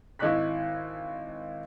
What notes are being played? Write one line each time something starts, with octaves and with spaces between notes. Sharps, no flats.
G#1 E4 D#5 C#6 F#6 B6